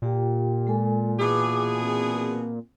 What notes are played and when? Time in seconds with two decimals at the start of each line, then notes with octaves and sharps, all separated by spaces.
0.02 A#2 F4 G4 G5
0.67 G#3 A4 G#5
1.19 B2 E3 G#4 D6 E6
1.81 C4